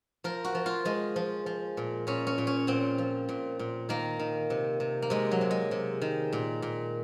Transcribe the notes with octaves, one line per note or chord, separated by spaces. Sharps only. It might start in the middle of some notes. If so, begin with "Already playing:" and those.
F3 A#4
F#4
F3
F4
F3 G#3
F3
F3
A#2
A#2 C#4
C#4
A#2
C#4
A#2 C4
F3
A#2
A#2
D#3 A#3
D#3
C3
C3
A#3
C3 G#3
F#3
C3
G#3
C3
D#3
A#2
A#2